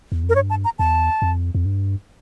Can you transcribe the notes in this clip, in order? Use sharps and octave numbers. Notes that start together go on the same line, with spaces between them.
E2
F2
A#4
G2 C#5
A5
A#5
E2 A5
F2
F2
G2